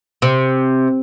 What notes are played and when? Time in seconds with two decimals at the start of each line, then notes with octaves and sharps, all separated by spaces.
0.22 C3